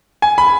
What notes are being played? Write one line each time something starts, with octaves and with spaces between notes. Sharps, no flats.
G#5
B5